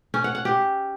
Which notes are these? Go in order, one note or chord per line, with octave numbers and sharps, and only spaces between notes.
C#4
F#5
F#5
G4